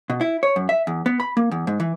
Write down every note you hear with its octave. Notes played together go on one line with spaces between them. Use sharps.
B2
E4
C#5
F#2
E5
E2
B3
B5
A#3
E2
G#2
E3